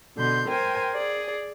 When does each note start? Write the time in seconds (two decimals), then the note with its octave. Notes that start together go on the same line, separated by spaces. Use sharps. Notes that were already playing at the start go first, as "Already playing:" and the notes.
0.17 B2 D3 C6 G6
0.48 A#4 C5 G5 G#5
0.93 G#4 D5